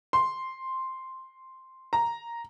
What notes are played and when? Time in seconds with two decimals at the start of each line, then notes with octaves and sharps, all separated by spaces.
0.13 C6
1.93 A#5